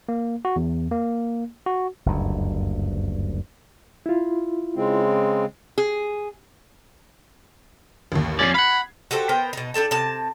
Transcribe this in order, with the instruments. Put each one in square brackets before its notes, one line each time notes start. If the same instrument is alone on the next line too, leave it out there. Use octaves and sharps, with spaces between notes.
[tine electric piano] A#3
F#4
E2
A#3
F#4
[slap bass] F#1 D2 G2
[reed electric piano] E4 F4
[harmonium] C#3 G#3 C4
[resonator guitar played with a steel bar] G#4
[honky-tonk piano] A1 D#2
[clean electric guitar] F2 A#2 D5 [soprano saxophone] C#4 [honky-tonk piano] G#6 B6 C7
[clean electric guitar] F5 F#5 [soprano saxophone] B5
[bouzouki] F#4 G4 A4 C5
B3 A#4 C5 G5
B2 D#4
D4 G4 A4 A5
C3 A5